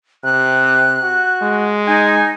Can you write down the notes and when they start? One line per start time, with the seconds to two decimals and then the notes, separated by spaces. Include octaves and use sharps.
0.24 C3 F#6
1.03 F#4
1.42 G#3
1.87 D#4 G#5